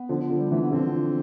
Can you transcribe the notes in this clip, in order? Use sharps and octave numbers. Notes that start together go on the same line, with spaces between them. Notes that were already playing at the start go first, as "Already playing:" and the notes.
Already playing: B3
D3 F3
D3 F3
G3
E3 A3
B3
D3 F3 C4